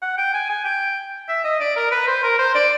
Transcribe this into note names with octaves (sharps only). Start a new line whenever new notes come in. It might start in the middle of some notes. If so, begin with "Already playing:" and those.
F#5
G5
G#5
G#5
G5
E5
D#5
D5
A#4
B4
C5
A#4
C5
D5